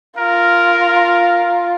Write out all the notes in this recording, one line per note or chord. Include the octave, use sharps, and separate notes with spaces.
F4 A#4